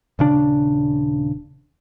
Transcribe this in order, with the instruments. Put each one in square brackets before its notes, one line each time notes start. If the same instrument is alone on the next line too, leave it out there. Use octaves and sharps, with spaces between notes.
[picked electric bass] D#1 C#3 D4